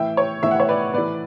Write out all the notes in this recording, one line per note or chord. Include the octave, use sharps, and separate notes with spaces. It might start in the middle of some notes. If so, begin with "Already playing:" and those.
Already playing: A2 E3 E5 G5
C#5
A2 E3 E5
F#5
C#5 E5
B4 D5
A2 E3 B4 D5